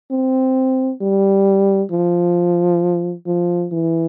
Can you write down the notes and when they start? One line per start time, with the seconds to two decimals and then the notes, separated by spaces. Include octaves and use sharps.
0.11 C4
1.01 G3
1.91 F3
3.26 F3
3.72 E3